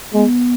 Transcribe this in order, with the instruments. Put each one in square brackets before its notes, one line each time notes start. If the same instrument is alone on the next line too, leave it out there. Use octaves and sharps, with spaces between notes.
[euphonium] G#3 [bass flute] B3